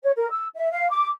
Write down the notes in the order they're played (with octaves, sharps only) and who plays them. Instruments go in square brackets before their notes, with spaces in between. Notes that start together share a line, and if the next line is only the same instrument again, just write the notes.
[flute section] C#5
A#4
E6
E5
F5
D6